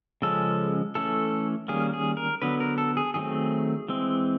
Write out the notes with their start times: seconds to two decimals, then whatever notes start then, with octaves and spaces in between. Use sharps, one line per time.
0.22 C#3 F3 G#3 C#4 A4
0.95 E3 A3 C#4 A4
1.68 D#3 G3 A#3 C#4 G#4
1.94 G#4
2.17 A#4
2.42 D3 F#3 B3 B4
2.60 A#4
2.78 A4
2.97 G#4
3.14 D#3 F#3 A3 C4 G#4
3.88 E3 G#3 C4